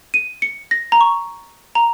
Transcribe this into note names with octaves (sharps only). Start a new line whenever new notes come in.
D#7
C#7
A#6
A#5
C#6
A#5